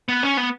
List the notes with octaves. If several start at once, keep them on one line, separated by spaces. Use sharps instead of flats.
B3
C#4
B3